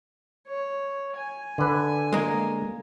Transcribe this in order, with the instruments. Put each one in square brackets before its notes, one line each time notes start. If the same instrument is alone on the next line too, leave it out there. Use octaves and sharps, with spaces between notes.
[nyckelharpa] C#5
G#5
[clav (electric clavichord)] D3 B4
[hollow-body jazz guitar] G#3 A#3